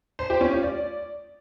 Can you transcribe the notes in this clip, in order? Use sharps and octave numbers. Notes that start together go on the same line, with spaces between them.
C5
G4
C#4
F4
D5